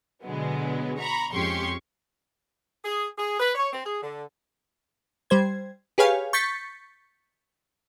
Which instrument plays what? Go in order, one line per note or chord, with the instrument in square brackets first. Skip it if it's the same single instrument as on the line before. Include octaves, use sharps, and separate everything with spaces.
[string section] B2 D3 F#3 G#3 B3
A#5 B5 C#6
F2 G#3 C#4 G4 C6 C#6
[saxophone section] G#4
G#4
B4
C#5
C4
G#4
D3
[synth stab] G3 C5 G#6
G4 G#4 B4 C#5 F5 G#5
C#6 G6 A6 B6 C#7